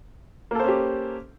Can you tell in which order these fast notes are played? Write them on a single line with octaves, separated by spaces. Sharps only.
A#3 A4 C5 C#4 G4